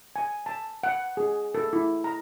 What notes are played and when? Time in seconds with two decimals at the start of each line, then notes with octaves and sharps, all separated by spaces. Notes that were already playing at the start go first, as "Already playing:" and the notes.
0.16 G#5
0.46 A5
0.83 F#5
1.17 G#4
1.55 A4
1.73 E4
2.04 A#5